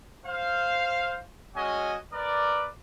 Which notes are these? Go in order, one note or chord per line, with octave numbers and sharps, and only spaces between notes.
C5 F5
G#3 C#4 F#4 D#5 G#5
A#4 B4 D5